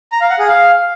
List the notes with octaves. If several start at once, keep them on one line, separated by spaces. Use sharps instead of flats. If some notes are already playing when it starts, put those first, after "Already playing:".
A#5
F5
F#5
G#4
F5